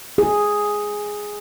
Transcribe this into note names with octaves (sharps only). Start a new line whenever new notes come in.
G#4